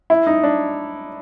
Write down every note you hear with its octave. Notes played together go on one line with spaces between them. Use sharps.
E4
D#4
D4